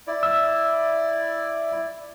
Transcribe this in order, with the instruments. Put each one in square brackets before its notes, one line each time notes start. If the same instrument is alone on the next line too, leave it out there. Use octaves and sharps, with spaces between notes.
[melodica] E4 D5
[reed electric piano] E6